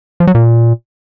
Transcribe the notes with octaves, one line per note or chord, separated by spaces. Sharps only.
F3
F#3
A#2